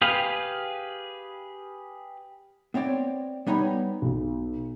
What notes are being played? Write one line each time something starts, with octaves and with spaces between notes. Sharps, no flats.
G4 G#4 B4 F5
B3 C4 C#5 D5 G5
G3 B3 D#4 C#5 B5
B1